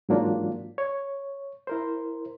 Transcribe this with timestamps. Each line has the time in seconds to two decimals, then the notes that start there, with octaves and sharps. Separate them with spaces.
0.09 G#2 E3 F#3 A#3 D4 F4
0.78 C#5
1.67 E4 A#4 C5